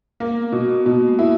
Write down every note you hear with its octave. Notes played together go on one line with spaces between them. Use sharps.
A#3
B3
B2 F#4
B3
B2 A#3
G#3
E4